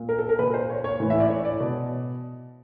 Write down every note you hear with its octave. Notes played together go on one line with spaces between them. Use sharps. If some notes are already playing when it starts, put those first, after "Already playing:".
Already playing: A#2
A#4
A4
A#4
A#2 B4
C5
C#5
C#5
A2 E3
E5
D5
C#5
D5
B2